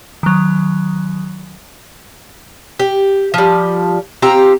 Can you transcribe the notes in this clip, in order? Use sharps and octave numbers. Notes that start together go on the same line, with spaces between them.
D#3 F#3
G4
F3 G3
C4 F4 G4 A#5